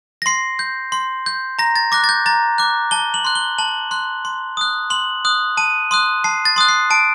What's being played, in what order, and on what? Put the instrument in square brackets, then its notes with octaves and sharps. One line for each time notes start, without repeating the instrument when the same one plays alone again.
[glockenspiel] A#6
C6 C7
G6
C6
G6
A#5 A#6
A6
D6 F#6 A#6
A6
G6
A#5 A6
D6 F#6
A5 G7
F#7
C6 F#6
G7
A5 F#7
C6 F#6
C6
D#6 F#6
C6 F#7
D#6 F#6
A5 D#7
C6 D#6 F#6
A5 C7
A6
C6 D#6 F#6
C7
A5 D7